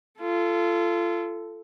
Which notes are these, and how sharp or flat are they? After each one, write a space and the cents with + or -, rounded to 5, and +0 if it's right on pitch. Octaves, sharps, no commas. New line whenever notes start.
F4 -25 A4 +0